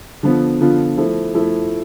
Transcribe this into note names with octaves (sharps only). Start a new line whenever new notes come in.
D3 F3 B3 F4
D3 F3 B3 F4
F3 A3 E4
F3 A3 E4